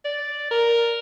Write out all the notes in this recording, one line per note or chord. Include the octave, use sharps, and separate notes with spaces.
D5
A#4